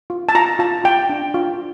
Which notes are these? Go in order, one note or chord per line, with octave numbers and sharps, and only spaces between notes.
F4
A5
F4 A#5
F4 A5
F4 G5
D4
F4